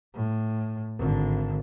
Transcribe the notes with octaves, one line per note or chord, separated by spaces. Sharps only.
A2
G#1 D3